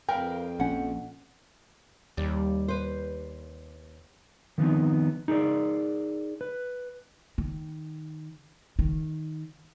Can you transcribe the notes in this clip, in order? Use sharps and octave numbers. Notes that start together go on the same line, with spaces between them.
F2 A#4 B4 F5 G5
A#1 C#4 F#5
D#2 G3
B4 C5
D#3 F3 B3 C4 D#4
D#4 G#4 A#4 D5
B4
D#3
D#3